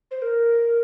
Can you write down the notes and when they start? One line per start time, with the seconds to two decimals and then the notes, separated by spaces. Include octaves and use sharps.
0.11 C5
0.22 A#4